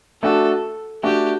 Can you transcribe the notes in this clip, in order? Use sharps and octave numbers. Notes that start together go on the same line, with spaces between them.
A3 D4 F#4 A4
A3 D4 F#4 G4